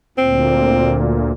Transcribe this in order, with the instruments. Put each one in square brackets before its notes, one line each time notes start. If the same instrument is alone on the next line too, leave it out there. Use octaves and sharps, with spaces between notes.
[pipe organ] D2 A#2 [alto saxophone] C4